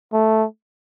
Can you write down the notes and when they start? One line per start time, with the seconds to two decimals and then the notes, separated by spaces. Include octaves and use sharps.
0.13 A3